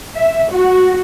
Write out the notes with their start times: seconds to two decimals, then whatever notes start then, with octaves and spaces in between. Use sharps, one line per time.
0.17 E5
0.53 F#4